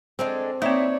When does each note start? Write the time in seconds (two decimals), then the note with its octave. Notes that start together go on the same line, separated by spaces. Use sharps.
0.19 G#3 C4 D4 A4
0.62 A#3 C4 D#4 E4 C#5 D5